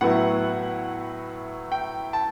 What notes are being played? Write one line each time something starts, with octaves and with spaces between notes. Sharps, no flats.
A2 F#3 B3 E4 F#5
G5
A5